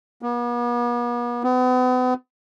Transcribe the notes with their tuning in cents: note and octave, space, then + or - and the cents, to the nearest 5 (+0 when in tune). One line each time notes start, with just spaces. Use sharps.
B3 -45
B3 +40